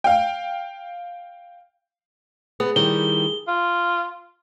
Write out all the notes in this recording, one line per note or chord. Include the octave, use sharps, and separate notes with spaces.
F5 G5
B3 G#4
D#3 G3 E4 G7
F4